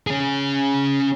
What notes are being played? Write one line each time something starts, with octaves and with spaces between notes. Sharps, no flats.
C#4 G#4